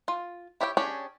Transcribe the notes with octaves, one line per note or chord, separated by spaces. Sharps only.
F4
E4 G4 C#5 E5 G5
C#4 D4 G4 G#4 C#5